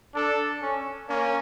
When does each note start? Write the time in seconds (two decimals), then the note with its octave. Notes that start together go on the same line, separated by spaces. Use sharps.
0.15 D4 A4
0.62 C#4
1.09 A#3 C#4